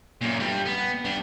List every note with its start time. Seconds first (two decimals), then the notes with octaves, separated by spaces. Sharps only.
0.21 F#2 A#2
0.40 G2 G3
0.65 B3
1.05 G3 D4